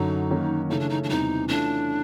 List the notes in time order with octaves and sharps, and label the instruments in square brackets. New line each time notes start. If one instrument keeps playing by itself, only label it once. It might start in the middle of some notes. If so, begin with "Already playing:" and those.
Already playing: [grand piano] F#2 D3 F#3 [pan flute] D#4
[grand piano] D#3 F#3 A#3 C#4 F#4
[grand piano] C#3 E3 A3 C#4 [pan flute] D#4
[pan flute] D4
D#4
D4
[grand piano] E2 C3 E3 G3 [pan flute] D#4
[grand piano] E3 A3 C#4 F4 [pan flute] D4